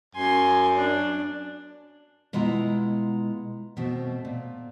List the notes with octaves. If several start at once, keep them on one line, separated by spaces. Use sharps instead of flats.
F#2 G#5 C6
D4
B2 G#3 E4 F4 F#5 A#5
B2 A3 C4
A#2